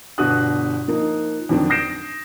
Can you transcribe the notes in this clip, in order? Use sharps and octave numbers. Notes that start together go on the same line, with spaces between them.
G1 B2 D4 F#4 D#6 F#6
F3 A#3 D#4
F2 D3 D#3 F#3 C4 D4
D#6 G6 A#6 C7 D7 E7